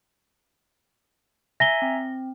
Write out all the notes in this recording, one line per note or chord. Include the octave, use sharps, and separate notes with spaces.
E5 G#5 A#5 A#6 G7
C4